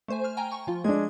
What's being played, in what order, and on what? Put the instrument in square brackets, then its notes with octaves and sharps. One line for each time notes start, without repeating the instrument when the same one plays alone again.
[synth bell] A3 C5 G#5
F6
G5 G#5 A#5
C#6
F3 F4
[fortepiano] G#3 D4 [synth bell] G#6